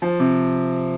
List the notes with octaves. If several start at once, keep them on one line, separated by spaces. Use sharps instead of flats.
F3
C3